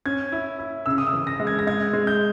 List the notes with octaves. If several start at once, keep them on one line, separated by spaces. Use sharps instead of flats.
C#4 G#6
E4
E4
C#3 E6
D#6
E6
E3
A#6
G#3
G#6
A#6
G#3 G#6
G#3
G6